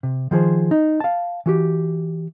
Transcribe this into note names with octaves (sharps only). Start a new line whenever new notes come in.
C3
D#3 F3 G#4 C5
D#4
F5 A5
E3 F#4 G4